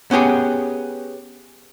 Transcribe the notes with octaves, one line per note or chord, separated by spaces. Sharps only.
B3 C#4 G4 G#4